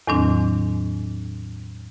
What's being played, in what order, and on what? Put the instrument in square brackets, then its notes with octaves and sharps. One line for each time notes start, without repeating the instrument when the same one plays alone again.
[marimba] E2 A2 D#3 F#3 C4 D4